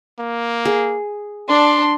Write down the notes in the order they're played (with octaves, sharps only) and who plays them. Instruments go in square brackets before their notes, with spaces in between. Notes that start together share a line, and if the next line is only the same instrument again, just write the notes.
[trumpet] A#3
[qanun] G#4
[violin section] D4 [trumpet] C6